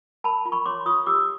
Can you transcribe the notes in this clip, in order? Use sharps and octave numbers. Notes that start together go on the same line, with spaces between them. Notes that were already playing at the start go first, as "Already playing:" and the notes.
A#4 A5 B5
F4
B5 C#6
C#5 C6 D6
F4 C#6 D#6
G4 D6 E6